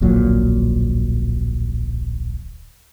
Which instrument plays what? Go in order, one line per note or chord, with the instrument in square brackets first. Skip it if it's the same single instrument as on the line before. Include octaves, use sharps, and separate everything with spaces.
[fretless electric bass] D1 A#1 A#2 F#3